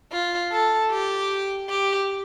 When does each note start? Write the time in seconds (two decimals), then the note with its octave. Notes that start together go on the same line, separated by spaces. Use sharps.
0.12 F4
0.51 A4
0.91 G4
1.69 G4